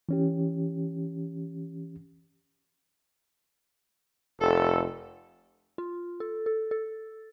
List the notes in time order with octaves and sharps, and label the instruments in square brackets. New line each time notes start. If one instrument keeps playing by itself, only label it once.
[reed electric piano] E3 C#4 G4
[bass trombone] F1 [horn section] A4
[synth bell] F4
A4
A4
A4